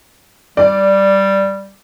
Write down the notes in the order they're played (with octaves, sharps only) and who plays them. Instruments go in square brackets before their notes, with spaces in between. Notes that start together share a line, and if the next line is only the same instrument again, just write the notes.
[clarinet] G3 [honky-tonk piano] D5